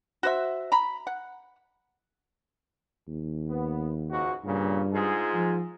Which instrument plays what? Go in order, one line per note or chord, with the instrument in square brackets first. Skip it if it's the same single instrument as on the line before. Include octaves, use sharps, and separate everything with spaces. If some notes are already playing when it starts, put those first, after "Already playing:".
[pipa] F#4 C5 E5
A#5 B5
F#5
[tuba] D#2
[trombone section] B3
C#2 G#2 F#4
[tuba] G2 [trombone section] A#2 C#3
[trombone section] G#2 F4 G#4
[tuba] F3